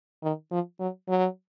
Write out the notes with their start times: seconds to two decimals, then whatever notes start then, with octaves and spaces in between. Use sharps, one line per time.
0.23 D#3
0.51 F3
0.80 F#3
1.08 F#3